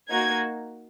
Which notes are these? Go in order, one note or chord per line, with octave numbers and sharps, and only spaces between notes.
A#3 D#4 F#4 G#6